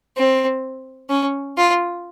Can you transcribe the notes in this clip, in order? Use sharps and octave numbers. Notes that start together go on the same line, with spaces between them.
C4
C#4
F4